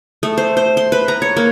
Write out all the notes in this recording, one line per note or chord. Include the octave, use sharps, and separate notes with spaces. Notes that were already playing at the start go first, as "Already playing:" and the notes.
A3
C5
C5
C6
B4
A#5
C#5
A#3